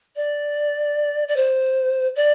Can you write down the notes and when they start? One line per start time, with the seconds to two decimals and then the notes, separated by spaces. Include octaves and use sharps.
0.15 D5
1.27 D5
1.36 C5
2.15 D5